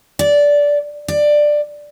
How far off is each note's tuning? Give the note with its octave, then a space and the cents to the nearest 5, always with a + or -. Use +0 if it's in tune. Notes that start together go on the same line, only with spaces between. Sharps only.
D5 -15
D5 +10